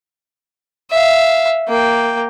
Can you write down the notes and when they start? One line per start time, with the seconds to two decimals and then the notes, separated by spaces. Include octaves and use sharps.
0.91 E5 F5
1.68 A#3 G5